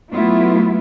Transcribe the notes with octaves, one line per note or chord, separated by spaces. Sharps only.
F#3 A3 B3 E4 F4